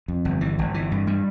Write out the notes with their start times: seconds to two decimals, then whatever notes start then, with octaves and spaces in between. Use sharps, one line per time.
0.08 F2
0.25 G1
0.41 E3
0.59 G1
0.74 E3
0.91 G2
1.07 G3